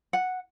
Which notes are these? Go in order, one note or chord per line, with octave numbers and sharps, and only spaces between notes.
F#5